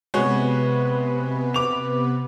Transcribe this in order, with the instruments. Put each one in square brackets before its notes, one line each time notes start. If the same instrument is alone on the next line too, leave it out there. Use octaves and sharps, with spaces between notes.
[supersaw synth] C3 B3 B4 [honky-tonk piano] G#3 F#4 C#5
[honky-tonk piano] D6 F7